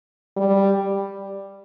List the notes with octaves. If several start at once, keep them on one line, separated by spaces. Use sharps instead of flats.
G3